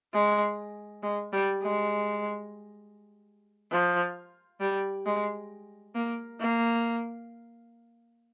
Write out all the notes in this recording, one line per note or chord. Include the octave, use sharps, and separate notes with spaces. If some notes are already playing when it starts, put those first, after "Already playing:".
G#3
G#3
G3
G#3
F3
G3
G#3
A#3
A#3